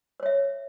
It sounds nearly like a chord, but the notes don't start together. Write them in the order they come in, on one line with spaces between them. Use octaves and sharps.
C5 C#5 E5